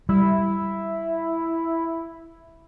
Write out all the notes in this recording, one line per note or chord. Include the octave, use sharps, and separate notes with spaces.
G3 E4